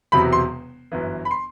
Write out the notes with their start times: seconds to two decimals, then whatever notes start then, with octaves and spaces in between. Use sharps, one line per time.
0.12 E1 E2 C3 F#3 B5
0.32 C6
0.92 G1 F#2 E3
1.25 B5
1.31 C6